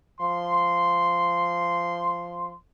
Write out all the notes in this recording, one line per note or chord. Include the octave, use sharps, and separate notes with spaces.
F3 C6